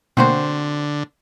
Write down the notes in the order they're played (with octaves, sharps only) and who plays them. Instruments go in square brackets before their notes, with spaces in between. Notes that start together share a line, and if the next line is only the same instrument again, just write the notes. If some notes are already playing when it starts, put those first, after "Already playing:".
[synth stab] B2 A3 A#3 [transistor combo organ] D3 [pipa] C4 F#4 C5